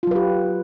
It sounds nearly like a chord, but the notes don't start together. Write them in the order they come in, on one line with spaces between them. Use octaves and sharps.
F4 F#3 B4 G4